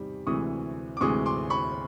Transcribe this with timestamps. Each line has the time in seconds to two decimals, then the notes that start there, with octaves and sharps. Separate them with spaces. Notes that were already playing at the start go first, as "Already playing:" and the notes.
Already playing: E2 C3 D#3 G3
0.27 D2 C3 E3 G#3 C#6 D#6
0.97 D6
1.01 D2 C3 E3 G#3 C#6 D#6
1.26 C6 D6
1.50 B5 C#6